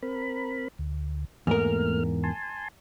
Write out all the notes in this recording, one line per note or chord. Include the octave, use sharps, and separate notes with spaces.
C4 A#4 B5
D2
E2 G#2 A3 A#3 A#4 F6
G#5 A5 C6